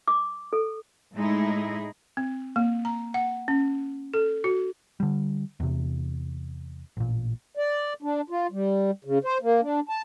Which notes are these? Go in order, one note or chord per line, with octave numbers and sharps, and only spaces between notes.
D6
A4
A2 G#3 D#4 E4 G#4
C4
A#3
A#5
F#5
C#4
A4
F#4
D3 G3
E2 C3
A1 A#2
D5
D4
F4
G3
C#3
C5
A#3
D4
A5